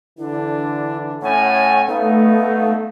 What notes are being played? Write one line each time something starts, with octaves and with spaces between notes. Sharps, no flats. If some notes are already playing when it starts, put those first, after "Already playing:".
D3 E3 D4 E4
A2 C#4 F#5 G#5
A3 B3 D#4 F5